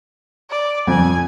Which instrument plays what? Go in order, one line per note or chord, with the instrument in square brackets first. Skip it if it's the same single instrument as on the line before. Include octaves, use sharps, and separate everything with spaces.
[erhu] D5
[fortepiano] F2 [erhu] G#5